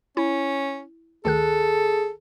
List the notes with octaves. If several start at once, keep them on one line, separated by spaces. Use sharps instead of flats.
C#4 E4
D2 D#3 G#4 A4 F#6